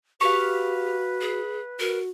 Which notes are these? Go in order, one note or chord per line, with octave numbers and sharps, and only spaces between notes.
F#4 G4 B4 F5 C#6
G#4
F#4 A#4